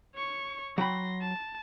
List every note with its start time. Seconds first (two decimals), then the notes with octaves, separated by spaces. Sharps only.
0.15 C#5 C#6
0.78 F#3 G5 B5 C6 A#6
1.21 A5